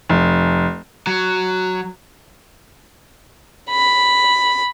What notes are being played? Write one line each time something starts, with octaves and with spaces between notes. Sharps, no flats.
F1
F#3
B5